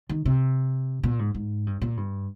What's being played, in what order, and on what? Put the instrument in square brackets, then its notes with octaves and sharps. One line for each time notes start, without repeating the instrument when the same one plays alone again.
[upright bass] D#3
C3
A#2
G#2
G#2
G2
A#2
G2